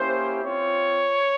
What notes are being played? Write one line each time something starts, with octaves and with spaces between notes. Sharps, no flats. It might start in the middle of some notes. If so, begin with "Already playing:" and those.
Already playing: A#3 C#4 E4 G4 C5
C4 F4 C#5